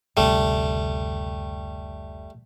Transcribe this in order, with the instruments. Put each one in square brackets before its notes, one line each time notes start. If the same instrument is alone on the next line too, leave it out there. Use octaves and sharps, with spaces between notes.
[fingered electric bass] F#1 D2 C3 [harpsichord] G3 A3